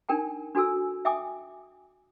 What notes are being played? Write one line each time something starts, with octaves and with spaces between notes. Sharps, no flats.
D4 D#4 A#4 G5 A5
D4 F#4 A4 G#5 E6
E5 G5 G#5 D6 D#6